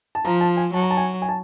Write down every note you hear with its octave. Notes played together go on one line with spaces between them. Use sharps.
A5
F3 A#5
A5
G#5
F#3 A5
A#5
A5
G#5
G#5
A5